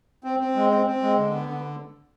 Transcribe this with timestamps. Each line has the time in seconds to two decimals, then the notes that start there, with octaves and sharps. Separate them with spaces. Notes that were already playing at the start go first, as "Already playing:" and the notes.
0.24 C4
0.40 C4
0.55 G#3
0.71 C4
0.87 C4
1.02 G#3
1.17 D3
1.33 B3
1.49 D3